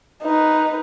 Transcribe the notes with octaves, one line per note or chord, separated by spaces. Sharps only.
D#4 B4